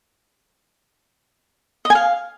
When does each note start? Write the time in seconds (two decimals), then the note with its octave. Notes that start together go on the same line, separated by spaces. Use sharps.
1.85 D#5
1.90 G#5
1.95 F5